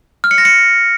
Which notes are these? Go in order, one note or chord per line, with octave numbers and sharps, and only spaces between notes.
F6
C#7
A#6
C#7